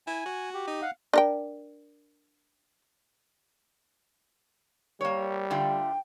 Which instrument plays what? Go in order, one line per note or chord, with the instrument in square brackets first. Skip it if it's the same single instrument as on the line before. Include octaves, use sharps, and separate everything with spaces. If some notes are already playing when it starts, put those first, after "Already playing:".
[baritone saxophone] E4 [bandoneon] G#5
[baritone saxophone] F#4
[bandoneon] G4
[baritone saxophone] D#4
[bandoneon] F5 F#5
[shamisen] D4 A#4 G5
[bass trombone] G3 [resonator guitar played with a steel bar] A#3 C#5
[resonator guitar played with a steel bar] D3 A3 F4 [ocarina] G5